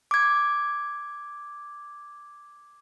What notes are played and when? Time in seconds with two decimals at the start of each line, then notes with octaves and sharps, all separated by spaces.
0.11 D6 G#6